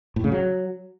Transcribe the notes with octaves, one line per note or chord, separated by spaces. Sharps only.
A2
C#3
F#3